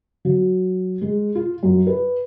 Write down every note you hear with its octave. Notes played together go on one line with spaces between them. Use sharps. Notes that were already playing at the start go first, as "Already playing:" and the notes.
F#3
G#3
F4
F#2
B4